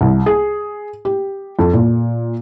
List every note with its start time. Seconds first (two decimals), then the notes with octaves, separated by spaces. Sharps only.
0.01 C2
0.26 G#4
1.05 G4
1.59 F2
1.74 A#2